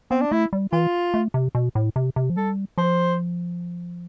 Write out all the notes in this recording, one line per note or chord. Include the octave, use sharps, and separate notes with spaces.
B3 C4
D4
A3 E4
G3
E3 F4
A3
C3
B2
A2
C3
C3
F3
G3 A4
F3 C5